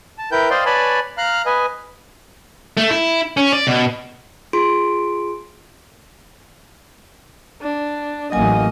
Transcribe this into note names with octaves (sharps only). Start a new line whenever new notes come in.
A5
E4 A#4 B4 G5 G6
C5 D5 D#5 F5 G5 C6
B4 C#5 D5 G#5 A5 B5
F5 A#5 F6 F#6
B4 D#5 G#5
A3
E4
C#4
D5
B2
F4 G#4 C6 D7
D4
A1 F#3 A#3 D#5 G#5